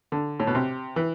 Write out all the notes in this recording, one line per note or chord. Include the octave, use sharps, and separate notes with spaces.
D3
A2
B2
C3
E3